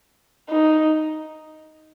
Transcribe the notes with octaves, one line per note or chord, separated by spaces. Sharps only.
D#4